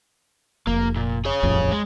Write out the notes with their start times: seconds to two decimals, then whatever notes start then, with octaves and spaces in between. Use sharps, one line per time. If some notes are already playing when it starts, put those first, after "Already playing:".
0.67 F1 A#3
0.96 A#2
1.25 G#4 C#5
1.43 D#1 A1 F2
1.72 G#3